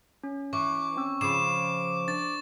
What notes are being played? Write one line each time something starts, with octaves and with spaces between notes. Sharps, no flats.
C#4
E3 C#6 D6
C4 C#4 E6
C#3 F3 B5 D6 C7 E7
D4 A6